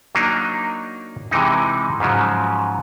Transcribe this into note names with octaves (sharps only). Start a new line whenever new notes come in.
F#3 A#3 D4 D#4
C3 E3 G#3 D#4
G#2 C#3 F3 F#3